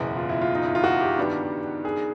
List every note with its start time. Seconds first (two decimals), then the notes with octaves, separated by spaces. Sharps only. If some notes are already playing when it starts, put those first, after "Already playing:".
Already playing: F#1 E2 B2 E4
0.17 F4
0.29 E4
0.41 F4
0.55 D#4
0.66 E4
0.75 F4
0.84 F#4
1.01 G4
1.18 G2 D#3 G3 B3 D4
1.85 G#4